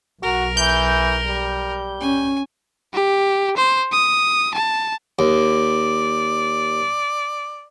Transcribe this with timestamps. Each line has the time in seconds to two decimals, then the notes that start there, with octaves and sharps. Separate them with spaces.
0.22 B1 F#4 A#4
0.57 E3 G6
1.26 G3
2.01 C#4 G#5
2.94 G4
3.57 C5
3.92 D#6
4.55 A5
5.19 D#2 D5